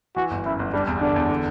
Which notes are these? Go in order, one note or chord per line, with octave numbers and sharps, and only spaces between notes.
E3 F#4
G1
F#2 E4
G1
G3 D4
E2
D3 D4
E2
D3